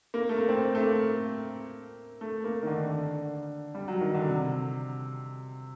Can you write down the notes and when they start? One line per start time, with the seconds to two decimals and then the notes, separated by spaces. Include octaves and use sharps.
0.14 A#3
0.29 A3
0.38 A#3
0.48 C4
0.75 A3
0.83 A#3
2.21 A3
2.44 A#3
2.63 D#3
2.67 D3
2.90 D3
3.75 G3
3.88 F#3
4.01 D#3
4.14 D3
4.28 C3